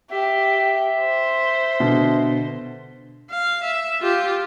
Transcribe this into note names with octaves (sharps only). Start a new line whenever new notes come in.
G4 E5
C5
B2 D3
F5
E5
F4 G4